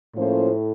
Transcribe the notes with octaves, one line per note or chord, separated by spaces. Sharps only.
A2 F3 A#3 C#4 F4 C5